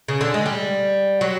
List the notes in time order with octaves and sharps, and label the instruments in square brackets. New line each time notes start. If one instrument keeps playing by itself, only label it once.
[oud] C#3
D3
G#3
G3
F#3